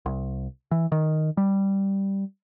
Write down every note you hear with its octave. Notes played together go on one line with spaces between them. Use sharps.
C2
E3
D#3
G3